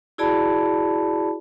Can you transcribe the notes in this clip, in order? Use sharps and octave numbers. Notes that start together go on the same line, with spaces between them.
E4 F#4 G#4 D5 A5 B5